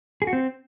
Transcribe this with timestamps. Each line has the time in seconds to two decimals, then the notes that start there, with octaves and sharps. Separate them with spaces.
0.22 G#4
0.27 F#4
0.33 C4